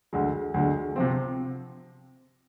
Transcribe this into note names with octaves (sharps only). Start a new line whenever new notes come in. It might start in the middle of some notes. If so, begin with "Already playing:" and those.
D2 D3 G#3
D2 D3 G#3
C3 F3 C4